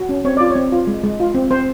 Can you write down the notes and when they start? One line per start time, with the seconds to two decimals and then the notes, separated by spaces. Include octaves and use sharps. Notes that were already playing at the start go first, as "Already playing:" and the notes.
Already playing: F#4
0.09 C#4
0.25 C4 C#5
0.37 F4 D5
0.51 C#5
0.56 C4
0.72 F4
0.87 G#3
1.04 G#3
1.20 F4
1.35 C4
1.50 C4 C5